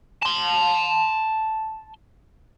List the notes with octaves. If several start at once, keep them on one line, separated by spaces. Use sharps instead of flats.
A5 C6